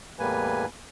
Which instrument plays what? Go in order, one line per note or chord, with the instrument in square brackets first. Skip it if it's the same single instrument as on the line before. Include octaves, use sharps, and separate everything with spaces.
[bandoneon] E2 A2 G3 A#3 B4 G#5